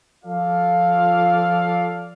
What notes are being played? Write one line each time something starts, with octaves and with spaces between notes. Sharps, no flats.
F3 F4 A4 D5 F5